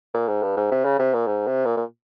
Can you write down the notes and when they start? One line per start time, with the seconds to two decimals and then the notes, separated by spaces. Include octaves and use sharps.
0.14 A#2
0.28 G#2
0.43 G2
0.57 G#2
0.71 C3
0.85 C#3
0.99 C3
1.14 A#2
1.27 G#2
1.47 C3
1.65 A#2
1.77 A#2